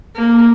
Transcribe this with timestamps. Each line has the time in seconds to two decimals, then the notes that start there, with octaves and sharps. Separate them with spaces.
0.15 A#3